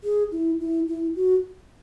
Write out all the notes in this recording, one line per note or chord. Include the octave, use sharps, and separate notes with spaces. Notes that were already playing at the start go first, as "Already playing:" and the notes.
G#4
E4
E4
E4
F#4